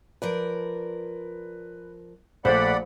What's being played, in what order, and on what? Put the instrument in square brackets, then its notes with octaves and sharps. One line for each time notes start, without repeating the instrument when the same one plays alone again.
[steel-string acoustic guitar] F3 A#4 D5 [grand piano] B4
[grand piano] A#1 A3 [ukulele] C5 [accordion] D5 F#5 B5